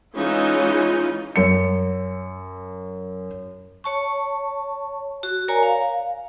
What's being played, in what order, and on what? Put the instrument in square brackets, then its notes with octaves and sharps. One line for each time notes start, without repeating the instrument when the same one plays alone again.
[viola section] E3 G#3 C#4 D#4 F4
[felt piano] F#2 C#7
[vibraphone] C#5 A5 C#6
F#4
A#4 C#5 D5 G#5 A#5
F5